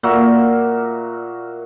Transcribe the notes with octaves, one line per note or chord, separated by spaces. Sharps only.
A#2 A#3 F#4 E5